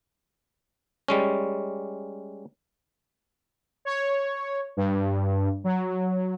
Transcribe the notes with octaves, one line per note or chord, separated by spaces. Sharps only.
G3 G#3 C#4
C#5
G2
F#3